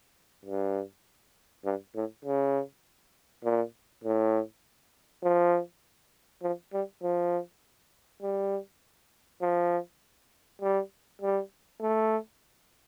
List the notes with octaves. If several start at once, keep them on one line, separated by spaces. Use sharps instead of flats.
G2
G2
A2
C#3
A#2
A2
F3
F3
G3
F3
G3
F3
G3
G3
A3